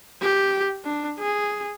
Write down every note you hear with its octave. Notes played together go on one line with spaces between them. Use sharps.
G4
D4
G#4